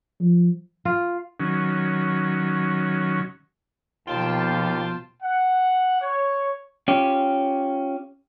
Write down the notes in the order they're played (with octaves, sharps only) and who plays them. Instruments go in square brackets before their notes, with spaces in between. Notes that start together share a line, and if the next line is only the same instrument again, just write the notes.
[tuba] F3
[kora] F4
[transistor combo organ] D#3 F#3 C#4
[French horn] D#2 [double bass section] B2 F3 [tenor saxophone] F4 [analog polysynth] G5 A5 C6
[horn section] F#5
C#5
[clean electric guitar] C#4 F4 G4